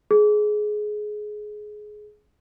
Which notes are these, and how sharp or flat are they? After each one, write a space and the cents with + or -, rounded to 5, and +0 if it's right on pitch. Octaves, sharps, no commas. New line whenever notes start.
G#4 +20